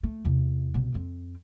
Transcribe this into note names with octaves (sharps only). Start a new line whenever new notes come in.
A3
E2 C3
C2 B2
F2 C4